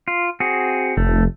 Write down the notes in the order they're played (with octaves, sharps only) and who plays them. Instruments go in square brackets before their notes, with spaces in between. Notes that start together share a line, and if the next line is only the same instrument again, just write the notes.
[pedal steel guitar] F4
C4 F#4 G#4
[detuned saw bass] F1 [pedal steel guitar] A3